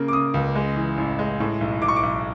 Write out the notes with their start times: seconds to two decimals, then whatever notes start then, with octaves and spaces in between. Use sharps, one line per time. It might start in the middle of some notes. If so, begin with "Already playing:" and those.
Already playing: C#3 A#3
0.08 D6
0.13 C#3 D#6
0.34 C#2
0.55 G#3
0.76 E3
0.98 A1
1.19 G#3
1.40 A2
1.61 B1
1.82 B1 D6
1.88 C#6
1.96 D6
2.03 B1